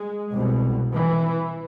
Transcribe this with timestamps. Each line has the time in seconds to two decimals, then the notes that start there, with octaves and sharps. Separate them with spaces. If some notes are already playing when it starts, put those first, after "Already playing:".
Already playing: G#3
0.34 C2 B2
0.93 E3